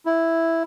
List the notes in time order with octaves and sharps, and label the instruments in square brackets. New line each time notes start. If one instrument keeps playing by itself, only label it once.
[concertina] E4